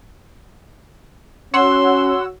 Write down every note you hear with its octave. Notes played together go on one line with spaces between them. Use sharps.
C#4 F#4 C#5 F#5 C6 E6